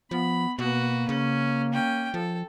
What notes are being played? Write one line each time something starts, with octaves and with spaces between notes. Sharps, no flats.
F3 B3 B5
B2 A#3 F#4 B4
C#3 C#4
C#4 G5
F3 A4